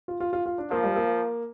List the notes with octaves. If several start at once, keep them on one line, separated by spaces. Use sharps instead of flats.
F4
F4
F4
F4
D4
F3 A#3
G3
A#3